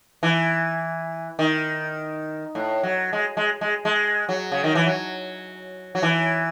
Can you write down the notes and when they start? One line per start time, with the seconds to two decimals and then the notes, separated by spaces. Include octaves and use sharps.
0.23 E3
1.39 D#3
2.55 A2
2.83 F#3
3.13 G#3
3.37 G#3
3.61 G#3
3.85 G#3
4.29 F#3
4.52 C#3
4.64 D#3
4.75 E3
4.86 F#3
5.95 F#3
6.03 E3